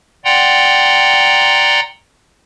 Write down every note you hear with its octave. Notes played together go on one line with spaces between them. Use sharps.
D5 F#5 G5 A#5 C6